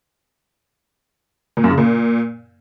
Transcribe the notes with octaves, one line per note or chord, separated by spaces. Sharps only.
A#2
F#2
C#3
A#2